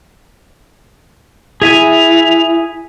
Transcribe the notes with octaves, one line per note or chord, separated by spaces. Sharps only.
E4 G#4 E5 G#5 F7